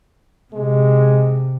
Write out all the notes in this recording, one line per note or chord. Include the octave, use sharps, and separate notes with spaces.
C3 G#3